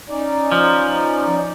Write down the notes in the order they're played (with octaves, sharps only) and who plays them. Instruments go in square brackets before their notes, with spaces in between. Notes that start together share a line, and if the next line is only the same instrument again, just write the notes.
[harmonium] C#4 D#4 D5
[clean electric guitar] F3